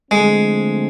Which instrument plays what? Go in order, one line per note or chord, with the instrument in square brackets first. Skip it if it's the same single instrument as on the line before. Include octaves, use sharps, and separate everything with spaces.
[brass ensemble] D3 F3 A3 C4 [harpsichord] G#3